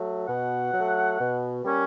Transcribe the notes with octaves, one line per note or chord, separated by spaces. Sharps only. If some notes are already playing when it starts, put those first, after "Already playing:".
Already playing: F#3 A3
B2 F#5
F#3 A3
B2
G3 A#3 C#4